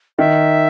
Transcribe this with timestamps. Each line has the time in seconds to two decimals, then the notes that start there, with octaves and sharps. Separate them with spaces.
0.19 D#3 E5